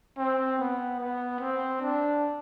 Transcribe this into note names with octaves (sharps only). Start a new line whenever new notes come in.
C4
B3
B3
C4
D4